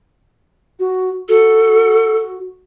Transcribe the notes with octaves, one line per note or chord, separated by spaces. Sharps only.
F#4
F#4 A4